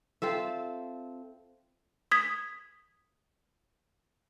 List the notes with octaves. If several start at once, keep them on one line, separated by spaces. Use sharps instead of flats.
C4 F4 A4 E5
D#6 G#6 B6